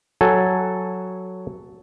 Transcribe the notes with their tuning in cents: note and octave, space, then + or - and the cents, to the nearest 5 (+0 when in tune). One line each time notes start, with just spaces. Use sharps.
F#3 +0 A4 +0 G#5 +0